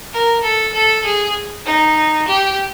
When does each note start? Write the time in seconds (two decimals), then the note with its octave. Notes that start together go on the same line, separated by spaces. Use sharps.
0.13 A#4
0.43 A4
0.74 A4
1.04 G#4
1.66 D#4
2.28 G4